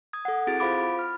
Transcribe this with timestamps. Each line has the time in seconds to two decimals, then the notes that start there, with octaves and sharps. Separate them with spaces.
0.13 D#6 G#6
0.25 A4 F#5
0.47 C4 E4 F#4 G#4 A6 D7
0.59 F4 C5 F5 B5 D6 D7
0.81 B5
0.99 F6